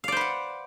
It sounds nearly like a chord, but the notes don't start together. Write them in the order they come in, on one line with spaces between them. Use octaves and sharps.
F5 D5 C5 B4 F#5